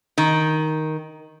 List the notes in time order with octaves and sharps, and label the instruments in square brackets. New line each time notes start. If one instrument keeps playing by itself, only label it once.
[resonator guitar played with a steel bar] D#3